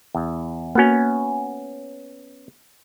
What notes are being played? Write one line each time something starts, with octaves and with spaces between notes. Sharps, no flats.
E2
A#3 B3 C#4 F#4